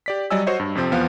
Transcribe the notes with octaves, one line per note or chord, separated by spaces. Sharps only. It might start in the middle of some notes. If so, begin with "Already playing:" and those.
G4 D5 B6
F#3 G3 D5 D#5 G#5 E6
F#4 C5 C#5 D#5
G2
F2 C3 F3 C4
E2 F3 B3 F5